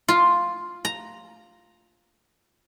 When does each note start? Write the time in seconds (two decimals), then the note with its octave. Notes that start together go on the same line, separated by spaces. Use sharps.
0.08 F4
0.85 A#5